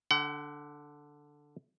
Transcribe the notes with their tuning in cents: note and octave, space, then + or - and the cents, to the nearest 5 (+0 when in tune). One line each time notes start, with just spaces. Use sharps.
D3 +0 F#5 +40